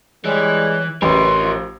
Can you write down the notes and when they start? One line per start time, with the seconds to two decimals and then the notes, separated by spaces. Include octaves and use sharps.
0.25 E3 G3 G#3 C#5
1.02 A1 F#2 C#3 A#4 B4 C#5 C6
1.41 F3